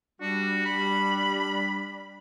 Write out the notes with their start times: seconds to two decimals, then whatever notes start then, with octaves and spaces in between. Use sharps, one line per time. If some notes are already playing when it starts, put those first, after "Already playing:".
0.21 G3 D4 F#4
0.66 B5